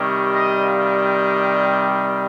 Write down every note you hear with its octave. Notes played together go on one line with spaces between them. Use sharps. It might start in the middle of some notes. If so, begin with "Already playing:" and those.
Already playing: C3 D#3 G3 C#5
D#5
F5
G5